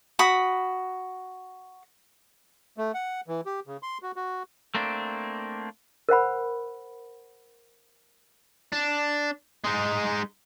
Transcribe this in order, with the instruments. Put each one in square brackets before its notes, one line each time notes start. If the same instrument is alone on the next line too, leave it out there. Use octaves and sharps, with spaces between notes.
[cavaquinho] F#4 B5 D#6
[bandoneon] A3
F#5
E3
G4
C#3
C6
F#4
F#4
[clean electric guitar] A3 A#3 C4 D4
[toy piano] A#4 C5 F#5 B5
[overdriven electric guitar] D4
G#3 D#4